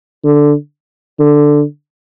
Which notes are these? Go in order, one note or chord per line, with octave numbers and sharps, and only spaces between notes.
D3
D3